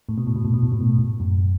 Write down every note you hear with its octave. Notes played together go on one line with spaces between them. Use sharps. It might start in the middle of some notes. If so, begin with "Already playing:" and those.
A2
B2
A2
B2
A2
B2
A2
B2
A2
B2
A2
F#2